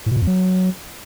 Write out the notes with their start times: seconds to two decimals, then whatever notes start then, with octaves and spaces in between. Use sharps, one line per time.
0.06 A2
0.11 B2
0.17 A#2
0.22 F2
0.27 F#3